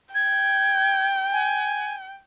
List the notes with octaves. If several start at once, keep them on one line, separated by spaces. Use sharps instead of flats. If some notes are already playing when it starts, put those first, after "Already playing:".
G5 G#6
G#5